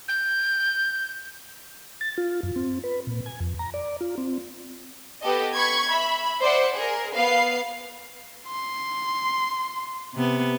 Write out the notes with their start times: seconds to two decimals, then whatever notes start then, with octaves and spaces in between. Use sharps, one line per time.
0.08 G6
2.01 A6
2.18 F4
2.43 F#2
2.56 C4
2.84 B4
3.07 A#2
3.26 G#5
3.40 F2
3.59 A#5
3.74 D5
4.01 F4
4.18 C4
5.21 B3 G4 A4 D#5
5.55 B5 C#6 G#6
5.89 E5 B5
6.41 C5 D5 E5 F#5
6.76 G#4 A#4
7.14 B3 B4 F5 C7
8.48 C6
10.14 C3 B3